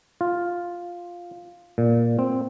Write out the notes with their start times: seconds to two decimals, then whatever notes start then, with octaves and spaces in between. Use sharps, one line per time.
0.21 F4
1.78 A#2
2.19 C4